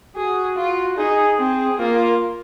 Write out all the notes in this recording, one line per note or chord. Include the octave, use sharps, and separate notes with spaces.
F#4 G#4
F4
D#4 G#4
C4 G#4
A#3 F4